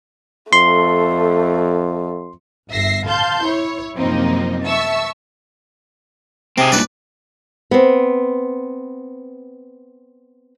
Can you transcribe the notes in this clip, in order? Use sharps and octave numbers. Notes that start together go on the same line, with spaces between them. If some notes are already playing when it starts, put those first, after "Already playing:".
F2 A3 C6
G1 E5 A#6 C7
F5 A5 C6 G6
E4 C#5
F#2 C3 F3 A#3 C4 D#4
E5 A5 C#6 E6
C3 C4 G#4
G2 A#2 B4 D5
B3 C4